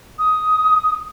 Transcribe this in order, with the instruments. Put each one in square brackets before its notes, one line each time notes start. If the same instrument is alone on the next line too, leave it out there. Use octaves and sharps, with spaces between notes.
[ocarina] D#6